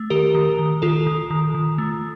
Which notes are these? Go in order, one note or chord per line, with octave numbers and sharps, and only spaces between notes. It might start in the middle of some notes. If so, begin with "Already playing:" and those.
Already playing: A3
D#3 G4 A#4
D#3
D#3
D#3 F4 A4
D#3
D#3
D#3
A3